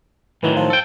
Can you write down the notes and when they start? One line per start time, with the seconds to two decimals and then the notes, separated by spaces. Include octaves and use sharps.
0.43 A2 D#3 E3 F#3
0.56 F3
0.70 A4 G5